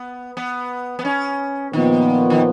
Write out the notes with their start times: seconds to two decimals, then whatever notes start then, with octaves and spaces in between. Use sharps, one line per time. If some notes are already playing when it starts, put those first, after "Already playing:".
Already playing: B3
0.37 B3
0.99 B3
1.05 C#4
1.73 A#2 D#3 F3 B3
2.30 D#3